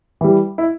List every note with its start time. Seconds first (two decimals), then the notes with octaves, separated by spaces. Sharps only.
0.21 E3 G3
0.58 E4